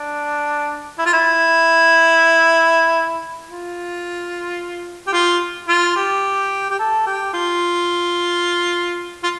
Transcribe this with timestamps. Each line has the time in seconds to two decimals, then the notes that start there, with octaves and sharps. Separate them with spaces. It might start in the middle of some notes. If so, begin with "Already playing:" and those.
Already playing: D4
0.98 E4
1.06 F4
1.13 E4
3.47 F4
5.07 G4
5.13 F4
5.68 F4
5.96 G4
6.70 G4
6.79 A4
7.06 G4
7.34 F4
9.23 F4